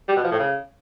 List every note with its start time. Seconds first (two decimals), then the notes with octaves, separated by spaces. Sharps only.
0.08 G3
0.16 B2
0.24 F3
0.32 A2
0.39 C#3